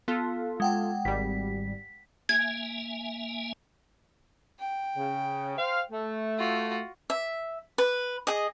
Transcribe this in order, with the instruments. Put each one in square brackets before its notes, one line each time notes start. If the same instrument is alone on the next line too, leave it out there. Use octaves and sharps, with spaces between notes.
[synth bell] B3 [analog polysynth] F4 A4
[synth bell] G#3 F#5 G5
[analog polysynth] G#1 G3 [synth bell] B6
[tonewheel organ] A#3 E5 G#5 [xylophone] G#6
[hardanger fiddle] G5
[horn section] C#3
C5 F5
A3
[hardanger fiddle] F4 F#4
[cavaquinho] E5
B4
G#4 D#5